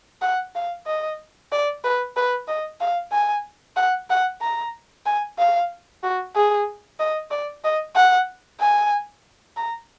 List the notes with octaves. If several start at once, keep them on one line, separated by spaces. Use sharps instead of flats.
F#5
F5
D#5
D5
B4
B4
D#5
F5
G#5
F#5
F#5
A#5
G#5
F5
F#4
G#4
D#5
D5
D#5
F#5
G#5
A#5